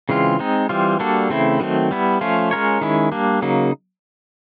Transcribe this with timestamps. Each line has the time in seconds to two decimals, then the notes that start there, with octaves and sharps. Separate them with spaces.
0.09 C#3 E3 G#3 C4 F4
0.39 G#3 C4 D#4
0.69 E3 G3 C4 F4
0.99 G3 A#3 D4 F#4 A4
1.30 C#3 E3 A3 C4 E4
1.60 D#3 F#3 A3 C4
1.91 G3 B3 E4
2.21 F3 A3 C#4 F4
2.51 G#3 C#4 F4 A#4 C#5
2.81 D#3 G#3 C#4 E4
3.12 G3 A#3 D4
3.42 C#3 F#3 A#3 D#4